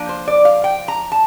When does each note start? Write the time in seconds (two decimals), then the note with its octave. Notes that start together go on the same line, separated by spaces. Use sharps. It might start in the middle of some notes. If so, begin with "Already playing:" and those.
Already playing: F3 A#3 D4
0.09 C5
0.28 D5
0.45 F5
0.64 G5
0.88 A#5
1.12 A5